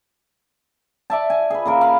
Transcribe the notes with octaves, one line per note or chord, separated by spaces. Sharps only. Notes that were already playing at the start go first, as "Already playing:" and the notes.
D5 E5 A5
G#5
G#4 B4
C#3 A#3 A#4
F5 B5